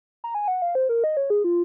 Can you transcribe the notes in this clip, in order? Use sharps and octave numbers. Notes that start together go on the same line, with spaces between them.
A#5
G#5
F#5
F5
C5
A#4
D#5
C#5
G#4
F4